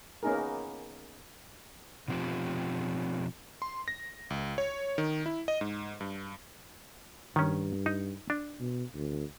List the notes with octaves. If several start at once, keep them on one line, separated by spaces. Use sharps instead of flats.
A#3 B3 C#4 D#4 G#4 A#4
B2 F3 C4 F4 G4
C6
A#6
C#2
C#5
D#3
E4
D#5
G#2
G2
G2 D#3 C#4
D#4
D4
B2
D2